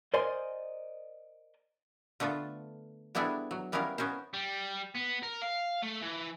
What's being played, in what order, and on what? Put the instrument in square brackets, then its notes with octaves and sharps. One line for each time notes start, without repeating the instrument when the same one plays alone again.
[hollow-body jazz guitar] A#4 C5 D5 D#5 G#5 C6
[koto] D3 A3 B3 F4 A4
G3 B3 D4 E4 G#4 A4
F#3
G3 B3 C#4 E4 A#4 F5
B3 C#4 A#4 C5
[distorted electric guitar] G3
B3
A#4
F5
A3
E3